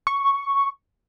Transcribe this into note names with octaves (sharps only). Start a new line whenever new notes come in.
C#6